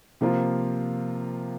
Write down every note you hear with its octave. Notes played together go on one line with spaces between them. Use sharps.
C3 F3 A#3 F4 A#4